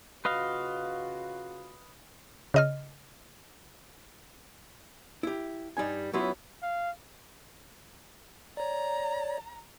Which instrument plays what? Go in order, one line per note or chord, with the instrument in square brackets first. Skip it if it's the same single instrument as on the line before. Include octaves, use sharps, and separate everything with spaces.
[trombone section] C#3 F4 F#4 [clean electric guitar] B4 D#5 F5
[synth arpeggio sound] C#3 D#5 F6
[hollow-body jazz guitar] E4 G4
G2 G3 D#4 G#5
F#3 B3 C#4 E4 F4 G4
[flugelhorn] F5
[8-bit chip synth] C#5 D5 [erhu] A#5